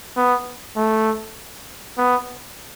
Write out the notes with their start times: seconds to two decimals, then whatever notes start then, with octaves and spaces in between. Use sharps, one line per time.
0.16 B3
0.76 A3
1.98 B3